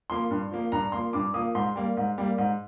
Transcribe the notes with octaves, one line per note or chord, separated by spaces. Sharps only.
F3 A#3 C6
G2
F3 A#3
G2 A#5
F3 A#3 C6
G2 D6
F3 A#3 D#6
G#2 C6
G3 A#3
G#2
G3 A#3
G#2